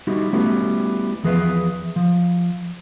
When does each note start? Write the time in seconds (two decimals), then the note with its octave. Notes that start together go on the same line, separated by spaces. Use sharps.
0.07 G3 D#4 E4 F#4
0.33 G3 A3 B3 C#4 E4 F#4
1.24 E2 F3 G#4 B4 E5
1.96 F3